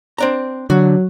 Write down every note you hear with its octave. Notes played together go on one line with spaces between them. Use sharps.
C4 D4 A#5
D3 F#3 F#4